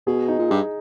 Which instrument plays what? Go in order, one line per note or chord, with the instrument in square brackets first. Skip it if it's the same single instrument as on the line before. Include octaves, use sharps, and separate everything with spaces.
[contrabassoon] B2 [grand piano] G#4
[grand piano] D#4
[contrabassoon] A#2
[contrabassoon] G2 [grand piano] G#4